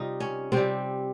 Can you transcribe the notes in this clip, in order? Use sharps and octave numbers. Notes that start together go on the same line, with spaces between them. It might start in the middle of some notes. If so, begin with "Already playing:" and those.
Already playing: C3 G3 D#4 F4
C#4
C3 G3 C4